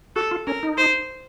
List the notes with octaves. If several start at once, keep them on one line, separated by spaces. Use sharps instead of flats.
F#4 A4
F4
C#4 A#4
D#4
C5